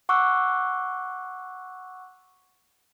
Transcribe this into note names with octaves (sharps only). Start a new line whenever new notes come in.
F#5 C#6 D6 E6 F#6